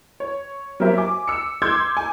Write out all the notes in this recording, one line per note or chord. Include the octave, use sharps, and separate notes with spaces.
C#5
F#3 A#3 G4 A#4 C5 E5
G#5 D6
E6 C#7
C6 D6 E6 G6 G#6
G#5